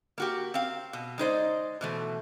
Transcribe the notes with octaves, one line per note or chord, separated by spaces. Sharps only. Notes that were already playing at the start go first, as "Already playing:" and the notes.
A#3 F#4 G4
C4 F5
B2
G#3 D#4 C5 D5
B2 E3 A3